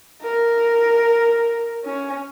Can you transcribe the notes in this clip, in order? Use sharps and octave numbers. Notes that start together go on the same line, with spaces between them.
A#4
C#4